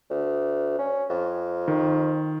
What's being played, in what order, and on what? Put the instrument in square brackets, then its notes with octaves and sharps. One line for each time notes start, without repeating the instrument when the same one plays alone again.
[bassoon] D2
C#4
F2
[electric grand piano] D#3